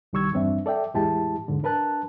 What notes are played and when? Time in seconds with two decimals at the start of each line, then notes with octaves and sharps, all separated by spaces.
0.13 C2 D#3 G3 C#6 E6 G#6
0.33 E2 G2 G3 C4 D4 E5
0.66 A4 D5 E5 G5
0.94 E2 A2 G#3 E4 G4 A5
1.48 E2 G#2 D3
1.63 D4 A#4 B4 A5 F#6